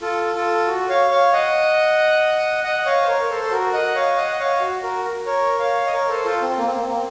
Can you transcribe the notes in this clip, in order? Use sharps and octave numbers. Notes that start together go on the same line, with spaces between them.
F4 A4
F4 A4
F#4
C#5 F5
C#5 F5
D#5 F#5
D#5 F#5
C#5 F5
C5
A#4 C#5
A#4
A4 C5
C5
F#4 A#4
D#5 F#5
C#5 F5
D#5 F#5
F#5
C#5 F5
F#4
F#4 A#4
A#4 C#5
C#5 F5
D#5
A#4 C#5
A4 C5
F4 A4
C4
A#3
C4
A#3
C4
A#3
C4